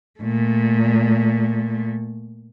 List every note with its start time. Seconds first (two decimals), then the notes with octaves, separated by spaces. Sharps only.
0.20 A#2 A3